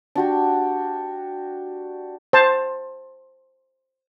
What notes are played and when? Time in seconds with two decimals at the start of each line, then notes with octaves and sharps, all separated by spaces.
0.15 D4 F#4 G4
2.33 C5 A5